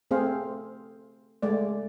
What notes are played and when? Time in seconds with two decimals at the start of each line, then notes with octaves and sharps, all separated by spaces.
0.11 A3 C4 G#4 C5 F5
1.42 G#3 A3 D5